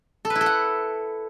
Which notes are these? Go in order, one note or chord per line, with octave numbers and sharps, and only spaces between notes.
A4
B4
E4
A4
F#5